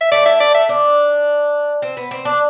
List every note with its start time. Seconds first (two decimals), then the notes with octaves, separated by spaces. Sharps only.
0.01 E5
0.12 A3 D5
0.26 E5
0.40 D5
0.54 E5
0.69 D4
1.82 C4
1.97 B3
2.11 C4
2.25 D4